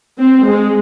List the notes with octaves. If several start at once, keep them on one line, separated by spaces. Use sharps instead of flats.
C4
G#3